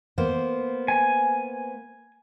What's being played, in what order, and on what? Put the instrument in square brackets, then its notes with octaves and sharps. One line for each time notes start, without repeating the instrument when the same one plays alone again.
[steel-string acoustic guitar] A#3 B3 C5
[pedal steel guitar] G#5